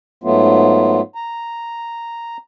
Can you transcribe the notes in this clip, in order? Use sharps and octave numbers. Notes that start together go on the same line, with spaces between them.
G#2 F#3 A3 B3 F4
A#5